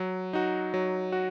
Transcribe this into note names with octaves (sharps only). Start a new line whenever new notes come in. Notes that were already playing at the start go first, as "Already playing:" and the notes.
Already playing: F#3
D#4 F#4
F#3
F#4